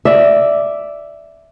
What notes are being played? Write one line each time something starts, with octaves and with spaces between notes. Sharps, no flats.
D5 E5